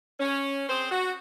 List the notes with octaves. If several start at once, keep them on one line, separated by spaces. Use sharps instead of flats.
C#4
C4 G#4 C5
F#4